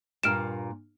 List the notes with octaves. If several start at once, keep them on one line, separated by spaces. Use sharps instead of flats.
G2 A#2 A#3 F6 D7 E7